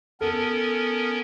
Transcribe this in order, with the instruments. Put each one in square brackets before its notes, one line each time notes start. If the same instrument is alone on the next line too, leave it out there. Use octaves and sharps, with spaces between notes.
[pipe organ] B3 C#4 A#4 [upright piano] A4